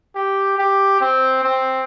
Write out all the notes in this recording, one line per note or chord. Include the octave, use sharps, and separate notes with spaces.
G4
G4
C4
C4